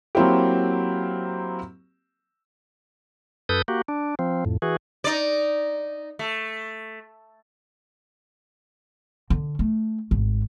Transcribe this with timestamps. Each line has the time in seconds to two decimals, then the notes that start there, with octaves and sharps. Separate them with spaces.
0.15 F#3 A#3 C4 E4 G4
3.49 F#2 A4 B4 D#6 G6
3.68 A#3 F#4 G4
3.88 D4
4.19 F3 C4
4.45 F2 A2
4.62 E3 F#4 G#4
5.04 D#4 D5
6.19 A3
9.30 D3
9.59 A3
10.11 G#1